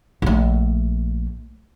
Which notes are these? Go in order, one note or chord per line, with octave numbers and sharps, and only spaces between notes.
A#1 A3